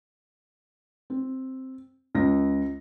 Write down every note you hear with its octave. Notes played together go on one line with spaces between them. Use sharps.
C4
C#2 A#6